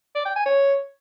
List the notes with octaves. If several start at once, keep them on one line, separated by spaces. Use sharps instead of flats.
D5
G5
G#5
C#5